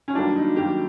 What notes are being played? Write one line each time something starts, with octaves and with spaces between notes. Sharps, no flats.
C#4
F#2 D#3 G3 A#3 D4
D#4
F#2 D#3 G3 A#3 G4